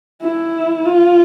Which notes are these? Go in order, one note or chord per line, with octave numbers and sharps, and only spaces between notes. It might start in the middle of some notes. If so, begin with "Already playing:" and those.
E4
F4